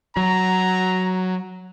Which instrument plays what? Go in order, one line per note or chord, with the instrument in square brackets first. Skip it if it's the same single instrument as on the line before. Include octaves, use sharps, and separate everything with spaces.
[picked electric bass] F#3 [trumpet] A#5